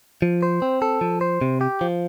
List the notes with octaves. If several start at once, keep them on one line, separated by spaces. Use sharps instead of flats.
F3
C5
C4
A4
F3
C5
C3
G4
F3